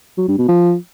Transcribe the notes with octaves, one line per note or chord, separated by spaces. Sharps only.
F#3
G2
B2
F3